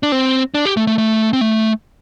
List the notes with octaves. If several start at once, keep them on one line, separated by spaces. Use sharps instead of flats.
D4
C4
D4
G4
A3
A3
A3
C4
A3